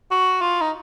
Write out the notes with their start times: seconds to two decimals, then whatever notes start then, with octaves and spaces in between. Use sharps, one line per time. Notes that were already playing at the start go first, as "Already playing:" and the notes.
0.11 F#4
0.41 F4
0.61 D#4